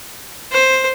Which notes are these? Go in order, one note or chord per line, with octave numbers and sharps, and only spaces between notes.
C5